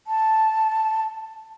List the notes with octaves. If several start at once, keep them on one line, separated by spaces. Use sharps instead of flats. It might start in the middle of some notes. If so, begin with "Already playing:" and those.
A5